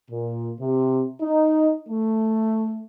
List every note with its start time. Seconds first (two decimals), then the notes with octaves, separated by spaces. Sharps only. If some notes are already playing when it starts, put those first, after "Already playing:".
0.10 A#2
0.59 C3
1.22 D#4
1.88 A3